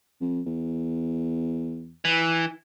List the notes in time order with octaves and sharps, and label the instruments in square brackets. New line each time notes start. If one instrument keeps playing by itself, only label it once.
[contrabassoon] F2
E2
[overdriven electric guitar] E3